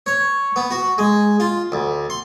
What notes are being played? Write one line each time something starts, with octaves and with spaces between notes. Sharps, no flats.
C#5
B3
F#4
G#3
F4
D2
C6